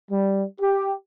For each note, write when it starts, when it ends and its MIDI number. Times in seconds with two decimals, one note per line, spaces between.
0.11 0.45 55
0.60 0.93 67